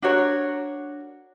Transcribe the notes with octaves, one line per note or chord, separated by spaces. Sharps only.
D4 F#4 A#4 C#5